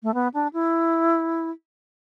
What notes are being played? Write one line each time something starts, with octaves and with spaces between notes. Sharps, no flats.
A3
B3
D4
E4